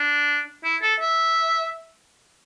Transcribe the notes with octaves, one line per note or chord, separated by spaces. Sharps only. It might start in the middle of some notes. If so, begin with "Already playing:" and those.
Already playing: D4
E4
A4
E5